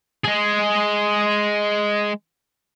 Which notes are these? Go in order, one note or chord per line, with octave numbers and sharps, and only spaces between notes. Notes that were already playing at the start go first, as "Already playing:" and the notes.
G#3 G#4